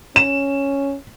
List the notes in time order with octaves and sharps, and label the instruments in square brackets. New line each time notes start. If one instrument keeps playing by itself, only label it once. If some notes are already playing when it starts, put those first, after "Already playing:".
[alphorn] C#4 [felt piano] E7